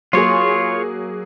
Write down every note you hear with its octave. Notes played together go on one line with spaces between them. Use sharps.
F#3 A#3 F4 G#4 C#5